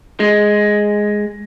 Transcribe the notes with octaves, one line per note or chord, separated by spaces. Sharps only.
G#3